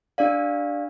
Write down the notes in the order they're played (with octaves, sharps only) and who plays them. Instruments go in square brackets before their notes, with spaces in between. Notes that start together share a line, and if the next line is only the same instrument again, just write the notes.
[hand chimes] D4 G4 D5 F5